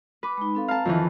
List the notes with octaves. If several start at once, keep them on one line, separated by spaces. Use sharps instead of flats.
B4 B5 D6
G#3 D#4
C4 A4 F5
F5 A5 A#5
F2 D#3 E3